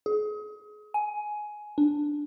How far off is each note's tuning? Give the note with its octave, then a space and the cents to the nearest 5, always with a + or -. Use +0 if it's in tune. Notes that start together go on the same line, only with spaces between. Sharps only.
G#4 +30
G#5 +15
D4 +5